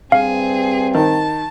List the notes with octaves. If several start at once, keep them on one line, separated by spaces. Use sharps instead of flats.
G2 C4 G#4 F5
D#3 A5